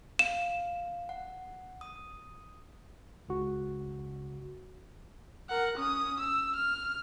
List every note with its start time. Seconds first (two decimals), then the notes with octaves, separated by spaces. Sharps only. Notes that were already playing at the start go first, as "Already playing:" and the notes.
0.19 F5 E7
1.09 F#5
1.81 D#6
3.29 C#2 C#3 F#4
5.49 A#4 F#5
5.78 C#4 D#6
6.20 E6
6.56 F6